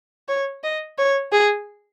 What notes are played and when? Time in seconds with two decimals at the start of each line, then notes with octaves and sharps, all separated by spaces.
0.29 C#5
0.64 D#5
0.98 C#5
1.32 G#4